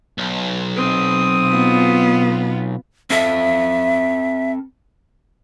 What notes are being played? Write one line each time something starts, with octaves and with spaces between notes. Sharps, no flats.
B1
C4 D#6
B3 F4
C4 A4 E5